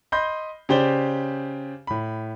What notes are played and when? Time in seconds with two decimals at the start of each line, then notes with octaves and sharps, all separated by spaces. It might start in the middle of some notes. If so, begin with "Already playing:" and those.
0.12 D#5 B5 C6 G6
0.69 C#3 G4 C5 D5 G7
1.87 A2 B5